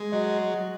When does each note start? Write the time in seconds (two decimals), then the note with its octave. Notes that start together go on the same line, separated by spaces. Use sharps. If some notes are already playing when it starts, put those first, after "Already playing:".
Already playing: G#3
0.12 F#3 D#5